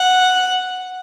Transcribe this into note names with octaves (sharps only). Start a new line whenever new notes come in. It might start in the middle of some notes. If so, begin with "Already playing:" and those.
Already playing: F#5